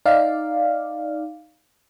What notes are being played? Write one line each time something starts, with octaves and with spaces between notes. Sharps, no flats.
D#4 D5 F5